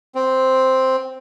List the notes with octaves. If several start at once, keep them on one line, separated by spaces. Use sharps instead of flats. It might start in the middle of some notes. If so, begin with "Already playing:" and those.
C4